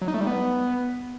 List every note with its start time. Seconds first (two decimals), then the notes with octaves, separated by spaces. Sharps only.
0.01 F#3
0.08 D#4
0.14 A3
0.21 G3
0.27 B3